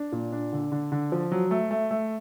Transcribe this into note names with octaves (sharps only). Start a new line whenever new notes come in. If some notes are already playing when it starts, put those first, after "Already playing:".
Already playing: D4
A#2
D4
D3
D3
D3
F3
F#3
A3
A3
A3